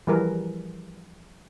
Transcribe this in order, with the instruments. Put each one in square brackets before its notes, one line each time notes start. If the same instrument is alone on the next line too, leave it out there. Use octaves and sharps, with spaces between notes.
[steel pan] E3 F3 G3 G#4 A#4 B4